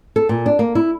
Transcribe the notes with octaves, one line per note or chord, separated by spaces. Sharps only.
A4
A#2
D4
A#3
E4